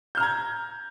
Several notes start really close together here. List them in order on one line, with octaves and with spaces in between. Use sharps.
G6 F6 A#5 G#6